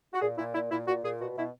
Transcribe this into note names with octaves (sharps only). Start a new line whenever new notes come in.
F#4
A#2 G#4
A#2 E4
A#2 E4
A#2 E4
A#2 F#4
A#2 G#4
B2 F#4
B2 E4